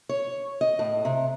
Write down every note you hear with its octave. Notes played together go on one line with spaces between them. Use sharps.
C#5
D#5
A2
C3